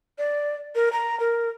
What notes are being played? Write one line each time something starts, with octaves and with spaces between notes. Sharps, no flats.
D5
A#4
A#5
A#4